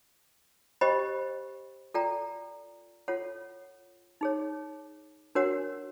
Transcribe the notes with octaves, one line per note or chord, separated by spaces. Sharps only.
G4 C5 D#5 G5 B5
F4 A4 D5 G5 A#5
F4 A4 C#5 F#5
D#4 G#4 C#5
D4 F#4 A#4 C#5 F#5